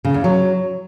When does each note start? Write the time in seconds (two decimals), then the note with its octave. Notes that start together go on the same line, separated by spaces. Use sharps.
0.05 C#3
0.14 E2
0.24 F#3